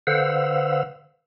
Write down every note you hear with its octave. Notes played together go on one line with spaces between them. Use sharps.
D3 B4 C5 F5 F#5 E6